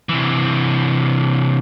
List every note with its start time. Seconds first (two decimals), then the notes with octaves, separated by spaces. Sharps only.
0.09 C3 E3